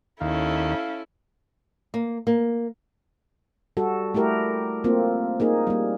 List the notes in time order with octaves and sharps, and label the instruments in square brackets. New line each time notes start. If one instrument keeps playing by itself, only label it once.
[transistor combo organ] D#2 [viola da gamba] C#4 A4 [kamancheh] E4 [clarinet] F5
[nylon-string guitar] A#3
A#3
[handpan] G3 F#4 A4
A3 E4 G4 A#4
A#3 C4 F4
A#3 D#4 G#4
G3 A#3